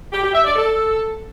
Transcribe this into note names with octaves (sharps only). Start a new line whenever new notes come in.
G4
G4
E5
D5
A4